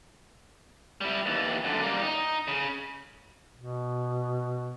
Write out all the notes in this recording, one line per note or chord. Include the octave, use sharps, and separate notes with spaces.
G3 E4
D#2 E3
F#2 D3
G3 A#3
D#4
C#3
B2